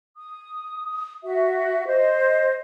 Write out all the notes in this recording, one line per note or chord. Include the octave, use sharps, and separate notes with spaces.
D#6
F#4 E5
C5 D#5